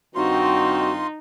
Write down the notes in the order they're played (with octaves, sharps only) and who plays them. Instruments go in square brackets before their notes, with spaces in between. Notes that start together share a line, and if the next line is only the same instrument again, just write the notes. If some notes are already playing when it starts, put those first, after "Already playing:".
[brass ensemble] G2 D#3 C4 [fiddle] D#4 [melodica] F4 C6 [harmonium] F#4